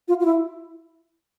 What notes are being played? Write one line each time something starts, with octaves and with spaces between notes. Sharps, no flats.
F4
F4
E4